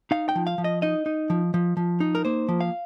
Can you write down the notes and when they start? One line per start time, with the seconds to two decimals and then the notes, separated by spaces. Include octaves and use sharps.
0.11 D#4 F5
0.29 G5
0.35 F3
0.47 F5
0.58 F3
0.64 D#5
0.82 D#4 D#5
1.06 D#4
1.30 F3
1.54 F3
1.77 F3
2.00 D#4
2.15 A#4
2.25 A#3 C5
2.48 F3
2.61 F5